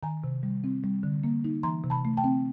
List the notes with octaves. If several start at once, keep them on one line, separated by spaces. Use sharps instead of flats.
D#3 G#5 A#5
C3
G3
C4
G3
D3
A#3
D#4
E3 A#5 C6
C3
A5 B5
A3
G5 A5
C4